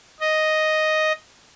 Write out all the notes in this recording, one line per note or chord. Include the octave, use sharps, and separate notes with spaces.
D#5